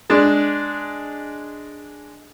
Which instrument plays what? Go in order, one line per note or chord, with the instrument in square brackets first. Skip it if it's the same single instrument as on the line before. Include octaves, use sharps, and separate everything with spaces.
[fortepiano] G#3 D4